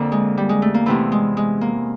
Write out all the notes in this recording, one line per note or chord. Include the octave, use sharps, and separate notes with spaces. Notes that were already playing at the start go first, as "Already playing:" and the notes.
Already playing: F2 D3 A#3
G#3
G3
G#3
A3
A#3
E2 C3 E3 A3
G#3
G#3
A#3